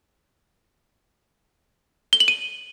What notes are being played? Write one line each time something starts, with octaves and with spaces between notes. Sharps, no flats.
G7
F#7
D#7